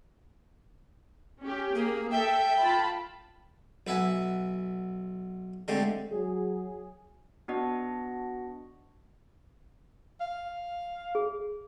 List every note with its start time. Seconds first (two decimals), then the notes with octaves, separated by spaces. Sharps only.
1.42 C#4 G4
1.75 A#3 G#4
2.11 A4 E5 G5
2.60 F4 A5 B5
3.87 B1 B4 E5 F#5 G#5
5.68 D3 G#3 A3 C4 G4
6.11 F#3 G#4
7.48 B3 D4 F#4 D#5 F#5
10.21 F5
11.15 G#4